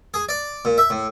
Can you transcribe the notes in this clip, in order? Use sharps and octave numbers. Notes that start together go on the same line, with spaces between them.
G#4
D5
A#2
E5
A2